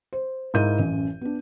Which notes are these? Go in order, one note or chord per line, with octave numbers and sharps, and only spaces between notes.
C5
G#2 E4 A#4 F5 G6 D#7
A1 F#2
B3 D4